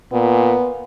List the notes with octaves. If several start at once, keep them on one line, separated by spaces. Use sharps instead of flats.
A#2 B3